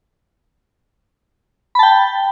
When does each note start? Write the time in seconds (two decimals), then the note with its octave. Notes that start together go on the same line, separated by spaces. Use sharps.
1.75 B5
1.79 A5
1.83 G5